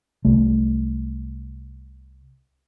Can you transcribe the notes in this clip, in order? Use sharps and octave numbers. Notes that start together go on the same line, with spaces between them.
C2 A3